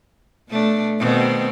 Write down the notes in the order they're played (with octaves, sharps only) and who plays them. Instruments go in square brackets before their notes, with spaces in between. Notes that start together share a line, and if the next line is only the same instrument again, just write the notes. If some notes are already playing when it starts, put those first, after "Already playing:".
[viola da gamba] B2 A3 D4
B2 D#3 C4